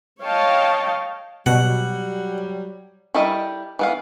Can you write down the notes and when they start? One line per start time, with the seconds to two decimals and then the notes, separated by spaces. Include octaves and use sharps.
0.22 C#5 D#5 F5 G5 A5
1.46 B2 F#3 G3 F#5
3.14 G3 E4 A4 A#4 D#5
3.79 E3 B3 F5